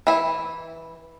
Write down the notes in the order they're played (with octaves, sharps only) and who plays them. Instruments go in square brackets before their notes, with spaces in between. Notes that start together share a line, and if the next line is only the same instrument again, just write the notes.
[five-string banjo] E3 E4